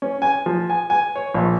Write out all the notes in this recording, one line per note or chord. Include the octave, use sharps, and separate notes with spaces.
C#4
G#5
F3
G#5
G#5
C#5
A#1